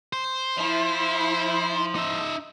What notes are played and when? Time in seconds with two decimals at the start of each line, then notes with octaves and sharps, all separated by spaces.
0.13 C5
0.58 F3 E4
1.96 D#4 E5